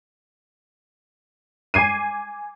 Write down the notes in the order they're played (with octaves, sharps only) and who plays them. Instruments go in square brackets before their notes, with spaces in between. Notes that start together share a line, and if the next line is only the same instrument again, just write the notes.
[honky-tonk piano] G#5 D6 G#6 C7 D#7